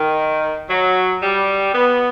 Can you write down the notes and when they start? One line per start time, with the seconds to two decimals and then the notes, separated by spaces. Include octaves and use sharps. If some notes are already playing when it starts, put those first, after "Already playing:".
Already playing: D#3
0.70 F#3
1.22 G3
1.75 B3